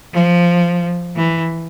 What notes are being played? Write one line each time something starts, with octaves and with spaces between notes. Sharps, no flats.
F3
E3